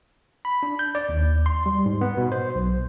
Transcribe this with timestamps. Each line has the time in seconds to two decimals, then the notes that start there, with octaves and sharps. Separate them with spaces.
0.45 B5
0.63 D4
0.79 G6
0.95 D5
1.09 D#2
1.46 C6
1.66 G3
1.86 G#2
2.01 B3
2.17 B2
2.32 C5
2.55 B1